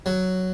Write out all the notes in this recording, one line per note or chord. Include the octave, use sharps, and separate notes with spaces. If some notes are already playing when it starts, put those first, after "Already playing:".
F#3